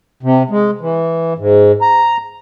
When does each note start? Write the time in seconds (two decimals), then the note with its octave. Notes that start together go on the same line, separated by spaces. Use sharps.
0.23 C3
0.50 G#3
0.81 E3
1.38 G#2
1.82 A#5